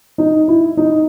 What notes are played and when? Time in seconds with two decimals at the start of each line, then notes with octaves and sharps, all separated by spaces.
0.18 D#4
0.48 E4
0.77 D#4